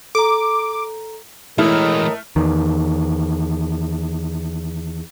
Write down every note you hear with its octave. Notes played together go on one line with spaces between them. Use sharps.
A4 A#5 D6
A2 E3 G#3 A3 E4 A#4 D#5 F6
E2 D#3